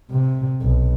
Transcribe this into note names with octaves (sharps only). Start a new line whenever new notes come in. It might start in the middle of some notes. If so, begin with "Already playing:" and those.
C3
B1